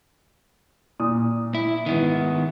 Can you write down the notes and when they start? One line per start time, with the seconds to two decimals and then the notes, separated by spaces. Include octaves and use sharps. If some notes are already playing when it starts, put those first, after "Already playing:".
0.99 A#2 D#6
1.55 E4
1.86 G#2 D#3 E3 B3 E5